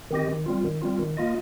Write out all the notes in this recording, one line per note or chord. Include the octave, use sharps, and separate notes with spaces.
D#3 C4 G4 D#5
D#3
G3 C4 F4
D#3
G3 C4 F4
D#3
A#3 F4 D#5